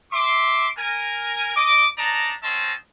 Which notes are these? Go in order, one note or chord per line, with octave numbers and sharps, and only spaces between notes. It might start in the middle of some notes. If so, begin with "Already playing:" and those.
E5 C6 D6
A#4 G#5
D#5 D6
D4 D#4 D5 A5 A#5
C4 C#4 D#4 C5 D#5 A5